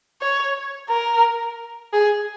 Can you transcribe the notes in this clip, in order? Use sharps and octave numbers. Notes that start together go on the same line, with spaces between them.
C#5
A#4
G#4